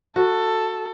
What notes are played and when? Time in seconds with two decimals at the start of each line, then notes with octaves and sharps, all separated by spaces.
0.16 F#4 A4